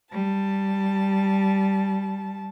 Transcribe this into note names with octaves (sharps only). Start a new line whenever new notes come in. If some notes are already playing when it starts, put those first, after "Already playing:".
G3 A5